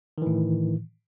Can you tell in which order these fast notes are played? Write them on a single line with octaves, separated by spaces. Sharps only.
D#3 E3 A2